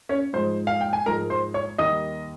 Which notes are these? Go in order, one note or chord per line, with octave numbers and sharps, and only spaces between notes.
C#4 C#5
G#2 F3 G#3 C5
F5
G5
G#5
G#2 F3 G#3 A#4 A#5
C5 C6
C#5 C#6
D#2 D#3 G3 A#3 D#5 D#6